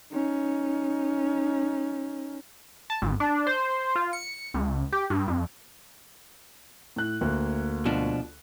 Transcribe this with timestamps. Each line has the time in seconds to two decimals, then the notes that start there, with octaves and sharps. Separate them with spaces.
0.12 C#4 D#4
2.90 A5
3.02 G#1
3.20 D4
3.47 C5
3.96 F4
4.13 C#7
4.54 C#2
4.93 G4
5.10 G2
5.28 F2
6.96 A2 F#6
7.21 D2 A#3
7.85 B2 F3 D4